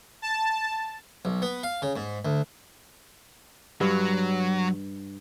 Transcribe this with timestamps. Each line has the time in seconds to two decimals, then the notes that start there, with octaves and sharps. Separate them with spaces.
0.22 A5
1.25 B1
1.42 B3
1.63 F5
1.82 C#3
1.96 G#2
2.25 D2
3.81 G2 F#3